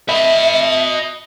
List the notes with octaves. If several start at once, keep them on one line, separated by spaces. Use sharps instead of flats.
D#5 E5 B5